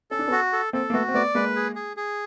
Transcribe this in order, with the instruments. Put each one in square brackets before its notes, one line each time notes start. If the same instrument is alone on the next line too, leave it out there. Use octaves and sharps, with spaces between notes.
[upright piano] C#4 [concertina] A4
[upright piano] D4
B3 C#4
[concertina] F#4
A4
[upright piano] A#3 C4 [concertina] A4
[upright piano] A#3
[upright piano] A3 B3 [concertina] F#4
[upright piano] C4
[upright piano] A3 B3 [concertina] D5
[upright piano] G#3 A#3 [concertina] B4
[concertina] G#4
G#4
G#4